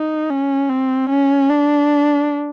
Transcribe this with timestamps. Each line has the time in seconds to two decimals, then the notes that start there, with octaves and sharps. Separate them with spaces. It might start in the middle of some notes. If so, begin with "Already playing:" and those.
Already playing: D#4
0.30 C#4
0.70 C4
1.10 C#4
1.49 D4